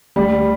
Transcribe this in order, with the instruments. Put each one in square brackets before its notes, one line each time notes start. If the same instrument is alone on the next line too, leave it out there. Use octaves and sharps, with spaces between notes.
[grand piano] D2 G3